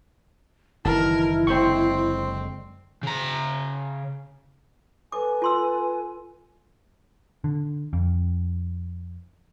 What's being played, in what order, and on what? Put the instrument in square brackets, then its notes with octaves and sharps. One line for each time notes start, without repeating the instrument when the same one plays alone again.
[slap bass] F#1 D#3 E3 [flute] E4 [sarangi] A#4 [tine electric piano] A5
[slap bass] F#1 D3 G#3 [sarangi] C4 [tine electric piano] C5 C#6
[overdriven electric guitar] C#3 A#5
[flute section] A4 B4 G#5 [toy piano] D6
[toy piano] F4 C6 E6
[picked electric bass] D3
F2